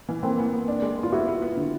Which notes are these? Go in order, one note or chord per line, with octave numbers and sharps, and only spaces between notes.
E3
E3 A#3 C4
B3
B3
D4
G#3
B3
F4
B3 E4 F#4
B3
B3
D3